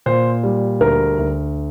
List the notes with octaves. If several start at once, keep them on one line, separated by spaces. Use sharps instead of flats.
A#2 C5
G3
D2 A#4
D2